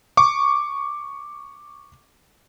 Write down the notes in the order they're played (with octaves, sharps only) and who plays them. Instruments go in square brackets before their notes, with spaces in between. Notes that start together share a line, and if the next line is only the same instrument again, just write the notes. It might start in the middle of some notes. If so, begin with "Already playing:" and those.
[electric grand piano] C#6 D6